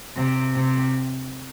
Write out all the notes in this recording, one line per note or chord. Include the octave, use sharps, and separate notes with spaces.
C3
C3